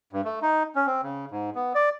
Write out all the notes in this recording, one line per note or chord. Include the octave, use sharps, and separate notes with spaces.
G2
A3
D#4
C#4
C4
C#3
G#2
B3
D5